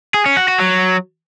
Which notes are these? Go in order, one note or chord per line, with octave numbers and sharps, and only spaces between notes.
G#4
C#4
F#4
F#4
F#3